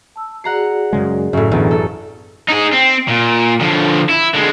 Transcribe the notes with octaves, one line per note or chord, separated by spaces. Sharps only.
A5 E6
F#4 G#4 D5 F#5 A#5 C7
F#2 C#3 G#3
F#2 A2 C#3
A1 E2 B2 D3
A4
D#4 G#4
C4
A#2
D3 F3
E4
D3 G#3